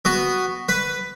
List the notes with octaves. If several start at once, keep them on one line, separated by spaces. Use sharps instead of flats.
B3 F#4
B4